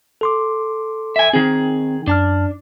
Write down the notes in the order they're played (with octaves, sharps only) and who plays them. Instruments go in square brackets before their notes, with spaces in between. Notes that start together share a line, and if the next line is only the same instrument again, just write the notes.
[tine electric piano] A4 C6 D6
[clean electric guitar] E5 G#5
[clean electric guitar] D#3 G#4 [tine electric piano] C4
[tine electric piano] F#2 A5 F6 [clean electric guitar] D4